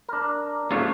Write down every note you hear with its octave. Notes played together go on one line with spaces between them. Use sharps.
D4 A#4
D#2 G#2 A3 C#4 F4 C#5